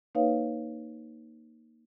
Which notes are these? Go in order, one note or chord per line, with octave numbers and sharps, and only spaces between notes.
A#3 D#4 B4 C#5 F5